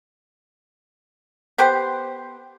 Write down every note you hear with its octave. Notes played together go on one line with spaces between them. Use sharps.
B3 G4 B4 C5